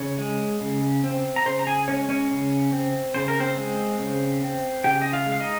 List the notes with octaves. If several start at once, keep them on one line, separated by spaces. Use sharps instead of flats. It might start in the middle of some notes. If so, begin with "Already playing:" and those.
Already playing: C#3 C#5 C#6
G#3
C#3
C4
A#5
C#3 C5 C6
A#5
G#4 G#5
G#3 C#4 C#5
C#4 C#5
C#3
C4
C#3 C5
A#4
C4 C5
G#3
C#3
C4
C#3 G4 G5
D#5
F4 F5
G#3
F5
D#4 D#5